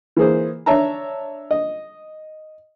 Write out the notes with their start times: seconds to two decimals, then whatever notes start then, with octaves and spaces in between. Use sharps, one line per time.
0.17 E3 A#3 G#4 C5
0.66 D4 C#5 E5 A5 A#5
1.51 D#5